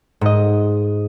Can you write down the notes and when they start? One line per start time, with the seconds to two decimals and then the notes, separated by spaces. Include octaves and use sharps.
0.21 G#2 D#5